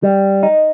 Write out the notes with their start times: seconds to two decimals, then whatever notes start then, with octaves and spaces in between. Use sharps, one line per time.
0.03 G3
0.43 D#4